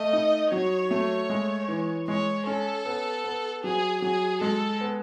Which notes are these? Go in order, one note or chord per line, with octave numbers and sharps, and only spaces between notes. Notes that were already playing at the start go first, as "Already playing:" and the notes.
Already playing: A3 D#5
D#4
F#3 C#5
A3
G#3
E3
G#3 C#5
C#4 A4
B3
B3
F#3 G#4
F#3 G#4
G#3 A4
B3